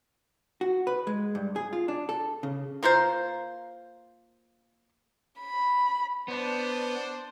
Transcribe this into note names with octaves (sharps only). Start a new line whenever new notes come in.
F#4
B4
G#3
G2
G#4
F4
D4
A4
C#3
A#3 F4 A#4 C5
B5
B3 D4 C5